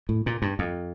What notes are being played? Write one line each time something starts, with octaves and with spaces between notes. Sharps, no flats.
A2
A#2
G2
F2